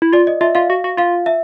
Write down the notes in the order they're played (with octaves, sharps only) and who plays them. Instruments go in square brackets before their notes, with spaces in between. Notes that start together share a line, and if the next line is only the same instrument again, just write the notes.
[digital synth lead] E4
[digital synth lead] F4 [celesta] D5
[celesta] D#5
[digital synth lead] F4 [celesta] E5
[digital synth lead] F4 [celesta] F5
[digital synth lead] F#4
F#4
[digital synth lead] F4 [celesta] F5
[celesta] E5